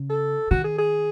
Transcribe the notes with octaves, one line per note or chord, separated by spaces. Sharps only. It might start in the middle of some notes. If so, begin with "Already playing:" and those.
Already playing: C#3
A4
D#3 F#4
G#4
G#4